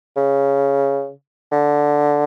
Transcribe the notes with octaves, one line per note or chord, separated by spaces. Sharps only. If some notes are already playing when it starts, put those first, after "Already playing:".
C#3
D3